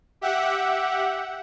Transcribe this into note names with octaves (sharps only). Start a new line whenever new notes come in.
G4 E5 F#5